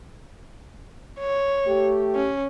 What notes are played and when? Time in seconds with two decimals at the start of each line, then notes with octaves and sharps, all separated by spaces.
1.20 C#5
1.66 A3 G4
2.16 C#4